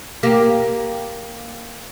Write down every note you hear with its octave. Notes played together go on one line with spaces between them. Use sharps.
A#3 G4